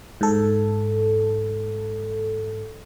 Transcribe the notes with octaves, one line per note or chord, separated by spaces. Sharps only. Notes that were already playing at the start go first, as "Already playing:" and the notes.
G#2 A4